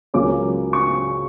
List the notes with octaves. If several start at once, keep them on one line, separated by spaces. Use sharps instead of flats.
C#2 C#3 F#3 A#3 C#4 D6
C#6